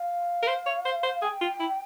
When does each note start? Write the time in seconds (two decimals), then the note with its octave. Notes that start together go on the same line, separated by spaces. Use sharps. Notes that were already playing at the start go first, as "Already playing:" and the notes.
Already playing: F5
0.43 A#4
0.47 C5
0.66 C#5
0.85 C5
1.03 C5
1.22 G#4 G5
1.41 F4
1.60 E4